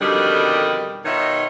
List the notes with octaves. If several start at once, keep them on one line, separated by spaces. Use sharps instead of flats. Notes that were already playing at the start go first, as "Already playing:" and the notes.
F2 B2 D3 D#3 G3
B2 D#3 D#4 F4 C#5 E5